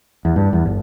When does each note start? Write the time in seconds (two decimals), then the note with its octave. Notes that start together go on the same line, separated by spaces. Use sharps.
0.25 E2
0.36 G2
0.53 E2
0.66 G1